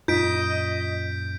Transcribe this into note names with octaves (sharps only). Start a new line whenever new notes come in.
F#2 A#2 F4 D#5 G6 B6 D7